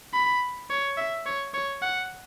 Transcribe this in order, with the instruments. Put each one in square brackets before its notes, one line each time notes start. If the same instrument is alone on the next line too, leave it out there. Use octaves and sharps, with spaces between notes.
[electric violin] B5
C#5
E5
C#5
C#5
F#5